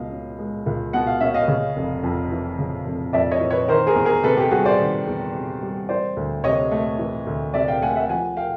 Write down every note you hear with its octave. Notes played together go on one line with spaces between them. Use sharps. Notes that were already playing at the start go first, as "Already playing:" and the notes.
Already playing: C#2 B2 D#5 F5
C#4
G#3
C#2
B2 F#5
F5
C#4 E5
D#5 F5
C#3
F1
F2
E3
C#3
F1
F2 D5 E5
C#5 D#5
E3
B4 C#5
D#3 A#4 C5
G#4 A#4
E2
G#4 A#4
C3 A4 B4
G4 A4
G3 F#4 G#4
C5 D5
D#3
E2
C3
G3
E3 C5 D5
D2
C3 C#5 D#5
A3
E3
D2
C3 D5 E5
F5 G5
A3 F#5 G#5
E5 F#5
F3 F#5 G#5
F5 G5